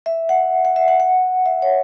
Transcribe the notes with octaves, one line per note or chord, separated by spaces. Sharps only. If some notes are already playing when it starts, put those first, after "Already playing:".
E5
F#5
F#5
E5
F#5
F#5
E5
C#5